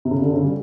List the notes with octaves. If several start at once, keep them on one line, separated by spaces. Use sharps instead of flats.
C3
C#3
D3
C#3
G3